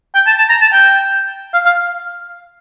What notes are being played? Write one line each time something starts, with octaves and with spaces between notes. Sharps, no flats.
G5
A5
A5
A#5
A5
G5
F5
F5